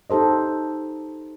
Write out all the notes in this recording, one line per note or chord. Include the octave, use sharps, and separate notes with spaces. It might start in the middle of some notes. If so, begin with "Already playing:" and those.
D#4 G4 A4 C5 D#5